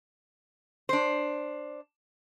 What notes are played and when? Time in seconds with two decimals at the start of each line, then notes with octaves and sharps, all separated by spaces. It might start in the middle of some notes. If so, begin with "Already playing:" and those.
0.89 D4 C5